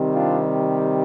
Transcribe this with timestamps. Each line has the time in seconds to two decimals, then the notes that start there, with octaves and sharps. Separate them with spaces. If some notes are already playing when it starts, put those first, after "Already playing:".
Already playing: C3 D#3 G3 C4
0.15 D4 F4